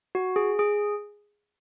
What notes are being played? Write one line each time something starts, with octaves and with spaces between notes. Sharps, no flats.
F#4
G#4
G#4